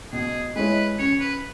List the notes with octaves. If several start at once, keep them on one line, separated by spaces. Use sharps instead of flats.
B2 G#4
G#3 E4 B4 C#5
C#3 C#5
B4